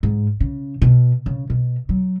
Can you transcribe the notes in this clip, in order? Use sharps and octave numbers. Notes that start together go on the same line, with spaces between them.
G#2
C#3
B2
C#3
B2
F#3